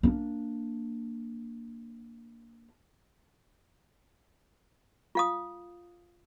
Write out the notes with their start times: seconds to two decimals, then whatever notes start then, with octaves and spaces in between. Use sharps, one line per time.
0.03 A#3 D4
5.15 F4 F5 D#6